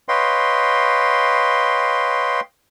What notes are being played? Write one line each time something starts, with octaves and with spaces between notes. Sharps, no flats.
B4 C#5 D#5 F5 G5 C6